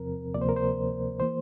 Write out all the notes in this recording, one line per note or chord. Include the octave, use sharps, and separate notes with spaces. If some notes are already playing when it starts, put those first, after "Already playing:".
Already playing: E2 C3 F3 C4 A#4
D2 C3 F3 A#3 D5
C5
A#4
C5
E3 A#3 C5